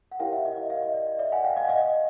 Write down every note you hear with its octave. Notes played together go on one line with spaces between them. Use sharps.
F#5
E4 G4 A#4 C#5 F5 G5
E5 F#5
D#5 F5
D#5
D#5 F5
D#5
D5
D#5
D5 E5
F#5 G#5
F5 G5
D#5 F5
F#5
D#5 F5